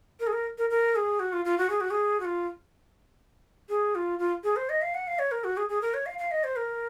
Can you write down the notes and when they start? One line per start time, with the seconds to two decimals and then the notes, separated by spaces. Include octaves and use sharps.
0.20 A#4
0.27 G#4
0.33 A#4
0.58 A#4
0.70 A#4
0.96 G#4
1.20 F#4
1.33 F4
1.45 F4
1.58 F#4
1.70 G#4
1.81 F#4
1.91 G#4
2.20 F#4
2.25 F4
3.69 G#4
3.95 F4
4.19 F4
4.44 G#4
4.56 C5
4.69 D#5
4.82 F5
4.94 F#5
5.07 F5
5.19 C#5
5.31 A#4
5.44 F#4
5.57 G#4
5.69 G#4
5.82 A#4
5.94 C#5
6.06 F5
6.19 F5
6.31 D#5
6.44 C5
6.56 A#4